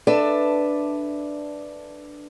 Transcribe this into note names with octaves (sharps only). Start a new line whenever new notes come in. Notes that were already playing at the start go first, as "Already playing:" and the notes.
D4 A4 B4 D5 E5